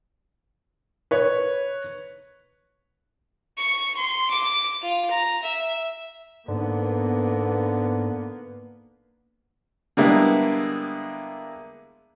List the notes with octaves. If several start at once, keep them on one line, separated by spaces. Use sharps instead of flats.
B4 C#5
C#6
C6
D6
F4
A#5
E5
G#2 D3 A#3 B3
D3 G3 G#3 A#3 B3 E4